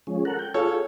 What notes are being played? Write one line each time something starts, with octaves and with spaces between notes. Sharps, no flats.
F3 G#3 C#4
A4 A#4 F#5
G5
F4 G#4 A4 C#5